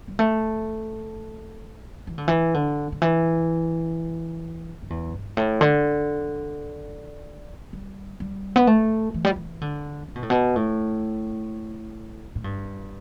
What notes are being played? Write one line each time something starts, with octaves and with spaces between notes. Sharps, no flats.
G3
A3
E3
D3
E3
D3
D3
E3
G2
E2
A2
G2
A2
D3
G3
G3
B3
A3
E3
G3
E3
D3
D3
B2
A2
B2
A2
A2
G2